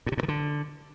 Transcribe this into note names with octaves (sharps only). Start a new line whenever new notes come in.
A2
C3
A2
D#3
D3